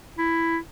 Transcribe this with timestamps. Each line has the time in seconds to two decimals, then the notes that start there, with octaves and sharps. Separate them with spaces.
0.18 E4